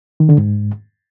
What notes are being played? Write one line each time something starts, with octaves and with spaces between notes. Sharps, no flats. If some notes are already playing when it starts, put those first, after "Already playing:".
D#3
D3
G#2